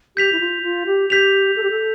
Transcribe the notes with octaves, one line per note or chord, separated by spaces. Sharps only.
G4 G6 B6 F7
E4
F4
F4
G4
G4 G6 B6 F7
A4
G4
A4